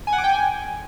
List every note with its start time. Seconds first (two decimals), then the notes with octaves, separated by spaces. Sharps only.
0.07 G#5
0.13 F#5
0.18 D6
0.24 G5
0.29 G#5